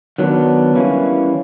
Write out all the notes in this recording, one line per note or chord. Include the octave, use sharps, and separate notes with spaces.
D#3 F#3 B3 D4
E3 G3 A#3 C#4 E4